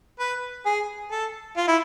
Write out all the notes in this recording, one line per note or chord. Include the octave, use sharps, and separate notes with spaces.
B4
G#4
A4
F4
E4